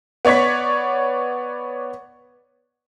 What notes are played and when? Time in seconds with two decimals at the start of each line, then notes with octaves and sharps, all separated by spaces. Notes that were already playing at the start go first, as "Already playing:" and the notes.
0.25 B3 C#5 D5 C#6 B6